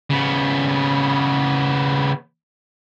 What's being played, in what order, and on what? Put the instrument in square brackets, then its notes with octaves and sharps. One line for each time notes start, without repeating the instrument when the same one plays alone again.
[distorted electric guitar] C#3 B3